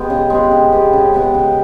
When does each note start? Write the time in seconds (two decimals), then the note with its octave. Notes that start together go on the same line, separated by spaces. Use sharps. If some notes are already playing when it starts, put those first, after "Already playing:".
Already playing: G#3 B3 G4
0.10 C#3
0.30 G#3 B3 G4
0.51 C#3
0.72 G#3 B3 G4
0.93 C#3
1.14 G#3 B3 G4
1.34 C#3